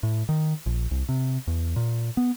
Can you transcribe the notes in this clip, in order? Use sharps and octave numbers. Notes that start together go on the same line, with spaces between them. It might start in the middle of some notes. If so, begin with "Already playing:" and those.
A2
D#3
A#1
C2
C3
E2
A#2
B3